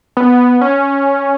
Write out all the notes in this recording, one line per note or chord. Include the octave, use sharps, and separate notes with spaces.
B3
C#4